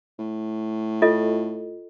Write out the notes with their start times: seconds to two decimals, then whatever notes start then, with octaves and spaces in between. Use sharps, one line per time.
0.19 A2
1.02 F4 A4 D#5